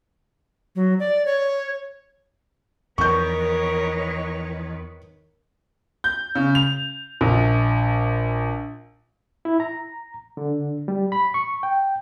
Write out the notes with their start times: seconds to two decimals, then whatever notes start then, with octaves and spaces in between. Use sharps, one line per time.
0.76 F#3
0.99 D5
1.26 C#5
2.98 E2 D#3 F3 A#4 B4 C#5 C#6 G6
6.04 G6
6.35 C#3
6.55 F7
7.21 A#1
9.45 E4
9.60 A#5
10.37 D3
10.88 G3
11.12 B5
11.34 C#6
11.63 G5